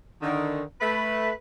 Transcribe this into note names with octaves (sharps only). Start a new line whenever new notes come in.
D3 D#3
A3 B4